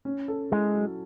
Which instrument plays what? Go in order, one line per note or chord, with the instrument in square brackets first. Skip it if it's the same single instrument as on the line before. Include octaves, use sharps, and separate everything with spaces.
[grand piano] C#4
A4
[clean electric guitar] G#3 [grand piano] E4
[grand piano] F#3